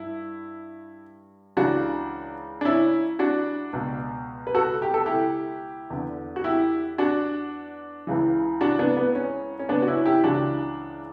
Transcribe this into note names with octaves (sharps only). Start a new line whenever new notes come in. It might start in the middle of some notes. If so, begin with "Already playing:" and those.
Already playing: G2 E4
C#2 C#3 E3 D4 F#4
D4
C#4 E4
D4 F#4
C#2 B2
B4
F#4 A4
G4
A4
E4 G4
E2 D3
F#4
E4 G4
D4 F#4
C#2 C#3 E3
D4 F#4
B3 D4
B3
C#4
C#4
B3 D4
F#4
C#4 E4
E4 G4
C#2 C#3 E3 D4 F#4